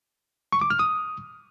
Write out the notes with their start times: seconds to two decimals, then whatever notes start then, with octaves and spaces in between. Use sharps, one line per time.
0.52 C#6
0.61 D6
0.70 F6
0.79 D#6